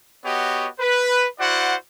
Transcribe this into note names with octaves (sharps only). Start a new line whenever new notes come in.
B3 F#4 G4 C#5 D#5
B4
E4 F#4 C5 D5 F#5